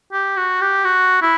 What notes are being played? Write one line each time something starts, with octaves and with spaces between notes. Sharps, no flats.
G4
F#4
G4
F#4
E4